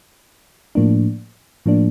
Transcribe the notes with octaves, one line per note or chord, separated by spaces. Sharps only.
A2 F3 A#3 D4
A2 F3 A#3 D4